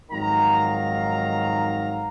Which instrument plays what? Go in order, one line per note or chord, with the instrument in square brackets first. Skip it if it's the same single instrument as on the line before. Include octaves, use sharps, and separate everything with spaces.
[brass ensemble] F2 G#2 D#3 F#3 F5 A#5